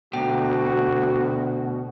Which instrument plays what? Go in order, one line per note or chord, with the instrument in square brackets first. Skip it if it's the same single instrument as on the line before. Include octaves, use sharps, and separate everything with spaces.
[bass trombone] D2 [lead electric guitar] B2 [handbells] A3 G5 [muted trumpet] F#4